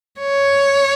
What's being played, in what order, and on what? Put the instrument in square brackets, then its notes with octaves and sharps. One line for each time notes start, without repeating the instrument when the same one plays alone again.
[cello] C#5